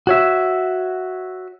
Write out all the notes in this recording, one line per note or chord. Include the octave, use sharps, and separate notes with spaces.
F#4 C#5 E5